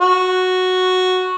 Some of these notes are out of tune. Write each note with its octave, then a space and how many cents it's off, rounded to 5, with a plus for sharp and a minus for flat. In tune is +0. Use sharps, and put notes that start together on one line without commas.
F#4 -5